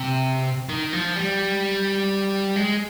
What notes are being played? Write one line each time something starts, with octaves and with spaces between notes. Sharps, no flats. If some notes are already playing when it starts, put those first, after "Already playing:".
Already playing: C3
D#3
F3
G3
G#3